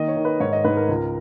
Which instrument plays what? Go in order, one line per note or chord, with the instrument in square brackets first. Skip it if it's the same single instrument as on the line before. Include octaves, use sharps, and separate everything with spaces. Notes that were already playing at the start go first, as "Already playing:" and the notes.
Already playing: [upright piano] D#3 A#3 D#5
C#5
D#3
B4
G#2 C#5
D#5
G#2 B4
A#4
C#2